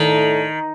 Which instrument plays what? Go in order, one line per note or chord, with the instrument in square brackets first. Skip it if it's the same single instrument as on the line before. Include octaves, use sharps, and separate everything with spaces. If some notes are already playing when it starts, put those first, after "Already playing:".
Already playing: [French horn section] A2 A3 D4 A4 [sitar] D#3